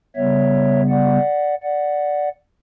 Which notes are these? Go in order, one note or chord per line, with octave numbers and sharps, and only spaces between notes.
C#3 G3 B3 C#5 E5
D5 F#5
D5 F#5